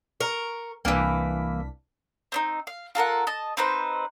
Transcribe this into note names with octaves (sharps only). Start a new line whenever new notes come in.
A#4 C#6
C2 E3 A#3 D4 B6
C4 D4 D#4
F5
F4 A4 A#4 F#5
D#5 A5
C4 D#4 B4 C5